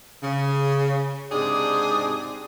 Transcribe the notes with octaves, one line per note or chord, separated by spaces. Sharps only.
C#3
G#2 C3 G#3 D4 G4 G#4